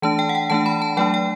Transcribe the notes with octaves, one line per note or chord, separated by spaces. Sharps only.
E3 A3 D4 A5
G5
F#5
G5
E3 A3 D4 A5
B5
A5
F#3 A3 D4 G5
G5